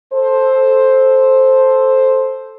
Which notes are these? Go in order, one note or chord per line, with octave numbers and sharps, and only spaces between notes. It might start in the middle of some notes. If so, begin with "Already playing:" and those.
A4 C5